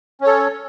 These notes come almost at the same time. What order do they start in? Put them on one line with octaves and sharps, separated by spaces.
C#4 C#5 A4